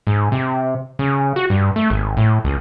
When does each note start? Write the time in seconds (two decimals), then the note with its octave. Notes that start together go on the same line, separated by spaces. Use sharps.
0.07 G#2
0.32 C3
0.99 C#3
1.36 F#4
1.50 G2
1.76 A3
1.90 G#1
2.17 A2
2.44 C#2